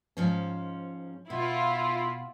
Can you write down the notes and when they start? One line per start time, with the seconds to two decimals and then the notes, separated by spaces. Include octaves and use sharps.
0.17 G#2 F3 C#4
1.30 B2 E4 F4